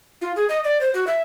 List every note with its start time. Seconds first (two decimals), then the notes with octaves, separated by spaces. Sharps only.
0.21 F4
0.36 G#4
0.49 D#5
0.64 D5
0.81 C5
0.94 F#4
1.07 E5